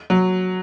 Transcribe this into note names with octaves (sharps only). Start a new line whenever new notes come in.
F#3